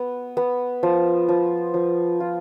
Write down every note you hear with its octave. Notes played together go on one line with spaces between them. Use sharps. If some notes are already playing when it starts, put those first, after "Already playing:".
Already playing: B3
B3
F3
F3
F3
F4